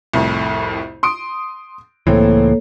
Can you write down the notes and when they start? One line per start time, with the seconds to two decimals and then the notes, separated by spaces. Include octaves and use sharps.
0.14 C2 F2 A2
1.03 C6 D#6 D7
2.07 C#2 A2 E3 A#3 C4 A4 C#5